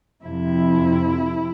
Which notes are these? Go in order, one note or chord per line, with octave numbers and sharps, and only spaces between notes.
F2 C3 F3 E4